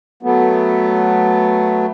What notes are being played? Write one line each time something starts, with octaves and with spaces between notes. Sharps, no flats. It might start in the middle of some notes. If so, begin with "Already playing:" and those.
F#3 A3 B3